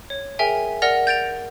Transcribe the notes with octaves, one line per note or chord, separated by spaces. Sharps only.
C#5
G#4 A#4 E5 G5 G#5
A#4 D5 F#5 F6 A#6 F7
G6 A6 D7 F7